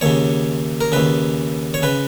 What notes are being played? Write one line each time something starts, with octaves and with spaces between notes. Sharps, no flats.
D#2 C#3 C#5
A#4
D#2 C#3 B4
C#5
C#3 B4